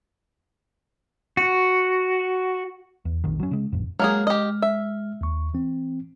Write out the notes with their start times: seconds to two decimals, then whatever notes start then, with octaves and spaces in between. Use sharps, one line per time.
1.37 F#4
3.05 E2
3.24 A#1 F2 D#3
3.40 F#3 C#4
3.51 C#3 G#3
3.72 A1 F2
3.99 F#3 G#3 A#3 G#4 F6
4.27 G4 D#5
4.62 E5
5.21 D#2 C#6
5.54 E3 C4